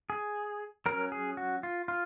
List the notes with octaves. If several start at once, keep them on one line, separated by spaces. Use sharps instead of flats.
G#4
F#3 C#4 A#4
G#4
F#4
F4
F4